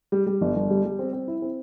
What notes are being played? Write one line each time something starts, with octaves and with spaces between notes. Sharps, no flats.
G3
G3
G1
G1
G3
G3
C4
C4
E4
C4